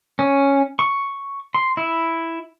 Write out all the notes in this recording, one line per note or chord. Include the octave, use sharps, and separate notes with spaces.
C#4
C#6
C6
E4